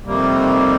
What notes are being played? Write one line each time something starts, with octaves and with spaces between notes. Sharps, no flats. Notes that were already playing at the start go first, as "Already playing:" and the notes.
F2 C3 D#3 G3 A#3